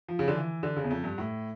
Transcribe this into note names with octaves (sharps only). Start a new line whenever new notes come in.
F3
C#3
D3
E3
D3
C#3
E2
F2
G2
A2